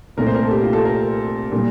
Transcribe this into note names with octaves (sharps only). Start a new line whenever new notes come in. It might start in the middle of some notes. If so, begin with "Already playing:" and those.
C2 A#2 A3 A#4
C5
A#4
A4
G4
F4
A4
A#4
A#2 G3 A#3